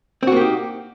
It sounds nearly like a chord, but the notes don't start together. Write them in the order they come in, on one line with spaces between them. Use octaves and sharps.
C4 F#4 A#3 G4 D#4